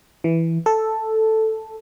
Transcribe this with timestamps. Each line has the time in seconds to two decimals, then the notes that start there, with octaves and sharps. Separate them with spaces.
0.24 E3
0.66 A4